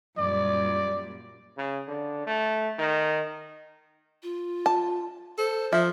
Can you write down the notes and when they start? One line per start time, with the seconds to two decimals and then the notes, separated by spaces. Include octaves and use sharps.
0.18 F#2 A#2 G3 D5
1.57 C#3
1.88 D3
2.27 A3
2.79 D#3
4.23 F4
4.66 A5
5.38 A4 C5
5.73 F3 E5